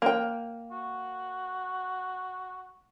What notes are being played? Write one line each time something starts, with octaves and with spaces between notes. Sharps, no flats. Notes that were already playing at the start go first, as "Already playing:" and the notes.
A#3 G5
F#4